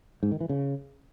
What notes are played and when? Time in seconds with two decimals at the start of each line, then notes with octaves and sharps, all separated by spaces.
0.23 G#2
0.32 D#3
0.41 E3
0.49 C#3